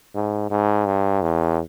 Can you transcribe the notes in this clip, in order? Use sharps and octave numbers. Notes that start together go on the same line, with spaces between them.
G#2
G#2
G2
E2